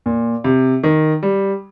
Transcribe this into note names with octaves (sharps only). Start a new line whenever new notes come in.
A#2
C3
D#3
G3